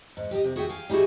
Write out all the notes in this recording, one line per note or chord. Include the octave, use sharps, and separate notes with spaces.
G#2
G4 A4 D#5
C3
F#4 G#4 E5 F#5 G5
F5 G5 G#5
G3 D#4 E4 F#4 G#4